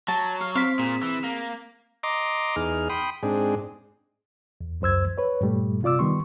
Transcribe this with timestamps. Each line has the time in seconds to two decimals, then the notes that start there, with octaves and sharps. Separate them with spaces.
0.08 F#3 A5
0.41 F5
0.55 C4 F5 B6
0.79 A#2 G#4
1.03 E3
1.24 A#3
2.03 D#5 A#5 C6 D6
2.56 E2 D#4 G#4 F6
2.90 G5 B5 C6 D#6
3.23 G#2 C4 D4 G#4
4.61 E2
4.81 C#2 F#2 C5 E6 G#6
5.18 B4 C#5
5.41 G2 A#2 G3 A3
5.83 C3 F4 D5 D6 E6
5.99 D#3 G3 B3 C6 C#6